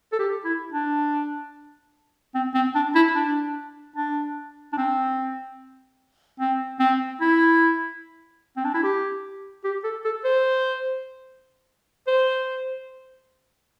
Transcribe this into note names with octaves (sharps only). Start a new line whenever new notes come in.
A4
G4
E4
D4
C4
C4
D4
E4
D4
D4
D4
C4
C4
C4
E4
C4
D4
E4
G4
G4
A4
A4
C5
C5